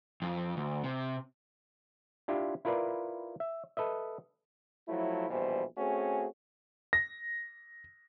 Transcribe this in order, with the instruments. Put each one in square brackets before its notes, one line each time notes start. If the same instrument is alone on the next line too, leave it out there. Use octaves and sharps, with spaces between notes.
[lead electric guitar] F2
D2
C3
[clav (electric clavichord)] D4 E4 F4 G4
E4 F4 A#4 B4 D5
E5
A4 B4 D#5 E5
[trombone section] F3 F#3 A3 E4
A#1 B2 E3 G3 C5
A3 C4 C#4 F#4 G#4
[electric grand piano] A#6